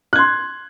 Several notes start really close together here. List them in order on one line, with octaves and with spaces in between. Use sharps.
F#6 G#6 C6